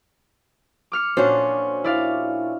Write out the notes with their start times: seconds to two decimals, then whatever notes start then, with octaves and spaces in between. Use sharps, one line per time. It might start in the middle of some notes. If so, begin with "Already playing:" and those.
0.92 D6 F6 C#7
1.17 A#2 C#4 D4 F#4 C5
1.84 E4 D5 F5